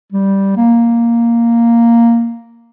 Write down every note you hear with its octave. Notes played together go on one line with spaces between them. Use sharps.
G3
A#3